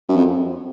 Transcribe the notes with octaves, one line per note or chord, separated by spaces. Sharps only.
F#2
F2